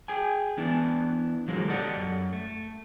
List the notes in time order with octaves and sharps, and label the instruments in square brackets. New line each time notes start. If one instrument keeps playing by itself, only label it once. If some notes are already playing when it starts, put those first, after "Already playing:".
[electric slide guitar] G#4 G5 G#5
E3 B3 D4 E4
A#2 D3 F3 F#3 G#3 A#3
G4 A4 D5 D#5 F#5
F#2
A3